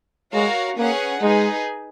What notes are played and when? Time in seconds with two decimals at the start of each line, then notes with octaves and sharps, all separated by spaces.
0.33 G#3 F#4 A#4 C#5 F5
0.77 A#3 C#4 G#4 B4 F#5
1.21 G#3 D#4 G#4 B4